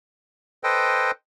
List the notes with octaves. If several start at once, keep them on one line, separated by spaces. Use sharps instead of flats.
A4 B4 C5 D#5 G5